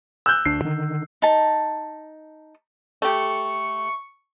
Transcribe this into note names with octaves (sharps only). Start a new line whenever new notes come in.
E6 F#6 G6
D2 D4 C7
D3 D#3
D#4 A5
A3 G4 C#6